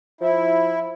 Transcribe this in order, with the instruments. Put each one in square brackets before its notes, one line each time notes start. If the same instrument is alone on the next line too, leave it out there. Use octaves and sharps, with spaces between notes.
[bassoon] F3 [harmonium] E4